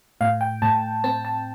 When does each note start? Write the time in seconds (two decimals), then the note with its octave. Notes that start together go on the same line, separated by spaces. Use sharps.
0.21 A2 F5
0.41 G5
0.62 A2 A5
1.04 C4 A5
1.25 A5